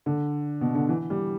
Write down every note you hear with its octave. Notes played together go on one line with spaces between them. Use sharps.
D3
B2
D3
E3
G3